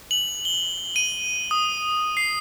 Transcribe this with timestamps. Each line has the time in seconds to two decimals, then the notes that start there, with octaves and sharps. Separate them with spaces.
0.11 F#7
0.45 G7
0.96 D#7
1.51 D#6
2.17 C7